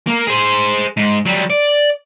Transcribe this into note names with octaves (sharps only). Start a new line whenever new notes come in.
A#3 A#4
G#4 C5
G#2
F#3 G3
D5